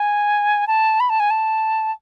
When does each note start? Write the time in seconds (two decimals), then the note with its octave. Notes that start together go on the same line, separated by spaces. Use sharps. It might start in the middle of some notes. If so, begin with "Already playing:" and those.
Already playing: G#5
0.67 A5
1.00 B5
1.10 A5
1.20 G#5
1.30 A5